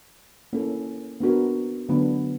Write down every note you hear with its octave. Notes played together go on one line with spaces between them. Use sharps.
A#3 C#4 E4 A4
B3 D4 F#4 A#4
D3 F#3 B3 D4